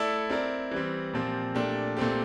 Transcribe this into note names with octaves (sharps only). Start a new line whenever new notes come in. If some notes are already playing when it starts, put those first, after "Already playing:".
Already playing: A3 E4 A4 D5
C4 E4 A#4 D5
E3 G3 C4
A#2 F3 C4 G4
A#2 A3 D4 G4
A#2 A3 C4 G4